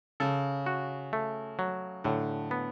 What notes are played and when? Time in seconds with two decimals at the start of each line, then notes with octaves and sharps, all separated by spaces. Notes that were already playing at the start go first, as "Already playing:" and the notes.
0.20 C#3 A4
0.66 F#4
1.13 A3
1.59 F#3
2.04 A2 D3
2.51 B3